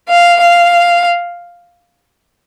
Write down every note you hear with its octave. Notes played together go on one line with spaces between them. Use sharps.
F5
F5